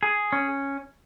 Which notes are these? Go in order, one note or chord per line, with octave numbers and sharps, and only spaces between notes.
G#4
C#4